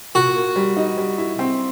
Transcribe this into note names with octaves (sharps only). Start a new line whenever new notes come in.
A#2 F#4
A#3
G3
D#4
G3
E4
C4